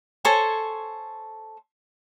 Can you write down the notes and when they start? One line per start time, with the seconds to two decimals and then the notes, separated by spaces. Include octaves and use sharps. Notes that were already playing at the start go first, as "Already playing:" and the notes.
0.25 A4 C5 C#5 G#5